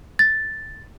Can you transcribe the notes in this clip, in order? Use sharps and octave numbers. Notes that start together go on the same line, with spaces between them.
A6